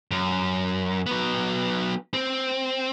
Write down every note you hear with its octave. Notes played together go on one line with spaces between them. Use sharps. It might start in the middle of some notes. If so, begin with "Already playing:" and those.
F#2
F#3 B3
C4